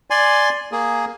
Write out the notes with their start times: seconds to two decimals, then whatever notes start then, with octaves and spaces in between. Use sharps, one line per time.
0.10 D5 G#5 C6
0.72 A#3 G#4